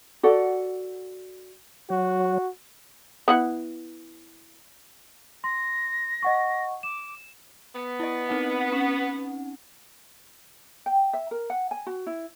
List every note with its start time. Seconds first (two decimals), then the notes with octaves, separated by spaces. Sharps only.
0.23 F#4 A4 D5 F#5
1.90 F#3 F#4
3.28 B3 E4 F#5
5.44 C6 A#6
6.23 D#5 F#5 C#6
6.83 D6 E7
7.74 B3
8.00 E4 D#5
8.29 C4 D#4 F#5
8.72 C#4
10.86 G5
11.13 E5
11.31 A#4
11.50 F#5
11.71 G#5
11.86 F#4
12.07 E4